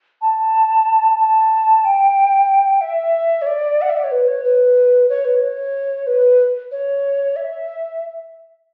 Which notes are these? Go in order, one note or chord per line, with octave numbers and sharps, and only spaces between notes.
A5
A5
G5
E5
C#5
D5
F#5
E5
D5
C#5
B4
C#5
B4
C#5
B4
C#5
B4
C#5
E5